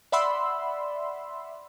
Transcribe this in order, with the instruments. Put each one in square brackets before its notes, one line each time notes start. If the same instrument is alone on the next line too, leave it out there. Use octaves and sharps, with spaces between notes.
[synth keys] D5 E5 F#5 B5 C6 E6